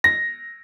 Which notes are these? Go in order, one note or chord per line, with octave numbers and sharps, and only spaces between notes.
A#6